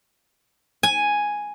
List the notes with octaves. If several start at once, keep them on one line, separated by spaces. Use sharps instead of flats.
G#5